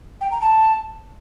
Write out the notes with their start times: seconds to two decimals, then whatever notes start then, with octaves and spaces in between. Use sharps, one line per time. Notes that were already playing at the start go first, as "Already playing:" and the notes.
0.21 G5
0.31 A#5
0.41 A5